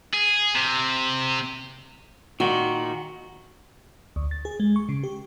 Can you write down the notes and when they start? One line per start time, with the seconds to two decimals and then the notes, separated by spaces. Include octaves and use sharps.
0.14 G#4
0.55 C3
2.40 A#2 D#3 F#4
4.16 D2
4.31 A6
4.45 G#4
4.60 G#3
4.76 C#6
4.89 C#3
5.03 G4